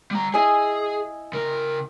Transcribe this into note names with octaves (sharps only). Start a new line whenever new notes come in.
G3 A#5
E4 G#4 D#5 G#5
C#3 A#4